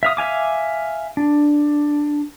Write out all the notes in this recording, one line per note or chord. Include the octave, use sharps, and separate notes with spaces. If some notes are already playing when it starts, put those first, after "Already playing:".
E5 F5 D#6
E5 F5 G#5 D6
D4